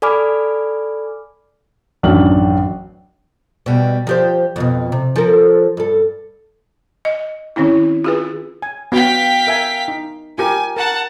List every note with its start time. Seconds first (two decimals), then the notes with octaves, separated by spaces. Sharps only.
0.02 A4 D5 G#5 B5 D6 F6
2.03 A1 F#2 D#3 D4 F#7
3.66 B2 G3
4.07 F3 G4 C5
4.56 F2 G#2 B2
4.92 C3
5.16 F3 A4 A#4
5.77 G2 A4
7.05 D#5
7.56 D#3 C4 C#4 E4
8.04 F4 G#4 B4
8.62 G#5
8.92 B3 F#4 F5 G5 B6
9.47 A#4 E5 G#5
9.88 D#4
10.38 F4 G4 A#4 G#5
10.77 A#4 F#5 A5